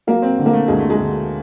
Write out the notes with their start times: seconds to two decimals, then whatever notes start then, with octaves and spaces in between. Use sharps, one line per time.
0.07 F#3 A#3
0.22 C4
0.38 D3
0.46 A#3
0.53 A3
0.68 D2 G#3
0.79 A3
0.90 G#3
0.99 D2